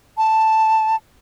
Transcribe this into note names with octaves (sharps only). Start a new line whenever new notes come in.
A5